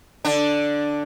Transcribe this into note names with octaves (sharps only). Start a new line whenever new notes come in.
D3 D4